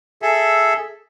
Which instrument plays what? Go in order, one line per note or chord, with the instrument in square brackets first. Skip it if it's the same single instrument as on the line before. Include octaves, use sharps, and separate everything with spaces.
[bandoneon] G#4 A4 E5